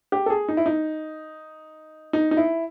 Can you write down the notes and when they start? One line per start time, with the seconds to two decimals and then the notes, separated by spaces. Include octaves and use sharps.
0.12 G4
0.26 A4
0.30 G#4
0.49 D#4
0.57 E4
0.66 D#4
2.13 D#4
2.31 D#4
2.37 E4